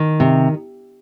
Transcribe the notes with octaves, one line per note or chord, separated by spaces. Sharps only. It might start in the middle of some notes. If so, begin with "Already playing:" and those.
Already playing: D#3
C3